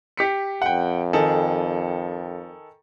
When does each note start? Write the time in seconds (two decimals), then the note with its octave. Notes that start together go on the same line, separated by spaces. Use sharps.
0.17 G4 B6 C#7
0.62 F2 F#5 G5
1.13 D#3 G#4 A4